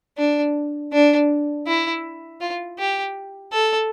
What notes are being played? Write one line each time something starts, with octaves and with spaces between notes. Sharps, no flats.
D4
D4
E4
F4
G4
A4